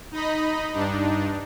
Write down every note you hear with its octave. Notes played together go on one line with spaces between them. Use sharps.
D#4 D#5 B5
G2 D4 D#4